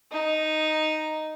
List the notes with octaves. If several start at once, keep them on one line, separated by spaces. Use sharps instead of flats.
D#4